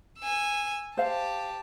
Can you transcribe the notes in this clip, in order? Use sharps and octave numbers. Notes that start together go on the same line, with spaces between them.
G#5 E6
G4 C5 F5 A5